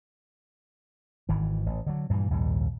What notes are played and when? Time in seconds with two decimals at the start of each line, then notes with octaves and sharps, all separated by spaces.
1.29 G#1 D#3 E3
1.66 A1
1.86 D3 F#3
2.10 G2 A#2 D#3 E3
2.30 A#1 D#2 G#2 G3